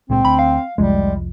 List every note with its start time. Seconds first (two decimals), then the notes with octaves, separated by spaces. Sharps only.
0.10 C#2 A#2 G#3 C4
0.25 D2 B5
0.39 F5
0.78 F1 C2 F3 G3 G#3